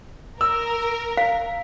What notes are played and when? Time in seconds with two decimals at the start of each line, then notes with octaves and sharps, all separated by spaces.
0.41 A#4 E6
1.17 F5